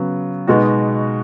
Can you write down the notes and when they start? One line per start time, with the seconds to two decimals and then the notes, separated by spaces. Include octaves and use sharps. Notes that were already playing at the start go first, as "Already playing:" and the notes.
Already playing: C#3 F#3 B3
0.47 B2 G#3 B3 D#4 F#4